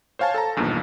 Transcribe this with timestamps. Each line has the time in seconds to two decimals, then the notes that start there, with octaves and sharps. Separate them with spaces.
0.19 C5 C#5 F5 G#5 A5
0.34 A4 A5 A#5
0.56 B1 E2 G2 A#2 D#3